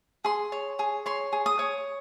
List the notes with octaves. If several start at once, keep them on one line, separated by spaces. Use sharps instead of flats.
G#4 C6
C#5
G#4
C#5 C6
G#4
D#6
C#5